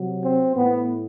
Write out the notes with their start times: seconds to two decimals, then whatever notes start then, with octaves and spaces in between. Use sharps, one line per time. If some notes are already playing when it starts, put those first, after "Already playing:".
Already playing: C3 F#3
0.21 C4
0.54 A2 E3 B3